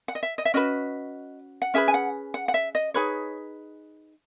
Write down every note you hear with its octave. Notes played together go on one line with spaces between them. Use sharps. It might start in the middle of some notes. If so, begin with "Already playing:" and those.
F#5
D#5
E5
D#5
E5
C#4 F#4 B4 D#5
F#5
C#4 G#4 B4 E5
G#5
F#5
F#5
F#5
E5
D#5
D#4 G#4 B4 C#5